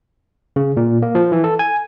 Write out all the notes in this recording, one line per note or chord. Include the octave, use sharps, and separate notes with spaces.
C#3
A#2
A#3
F3
E3
A4
G#5